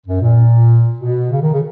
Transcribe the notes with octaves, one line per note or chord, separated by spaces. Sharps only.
F#2
A#2
B2
C#3
D#3
C#3